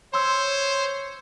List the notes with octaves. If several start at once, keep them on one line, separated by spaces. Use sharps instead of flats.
C5 C#5 C6 E6